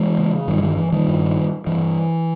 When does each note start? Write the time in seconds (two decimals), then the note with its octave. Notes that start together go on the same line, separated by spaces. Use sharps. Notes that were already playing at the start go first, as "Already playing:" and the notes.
Already playing: E3 G#3
0.18 C#3
0.48 G2 D#3 G3
0.63 D#3
0.77 E3
0.92 D#3 G3
1.08 G2
1.67 G2 E3